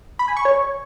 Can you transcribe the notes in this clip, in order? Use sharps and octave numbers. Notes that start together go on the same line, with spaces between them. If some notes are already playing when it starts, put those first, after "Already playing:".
B5
G#5
C#6
C#5